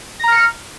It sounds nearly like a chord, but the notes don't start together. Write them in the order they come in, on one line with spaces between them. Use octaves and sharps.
A#6 A#5 F6 C#7